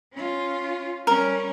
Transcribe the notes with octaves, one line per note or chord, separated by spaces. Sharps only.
C#4 F4
G3 C#4 A#4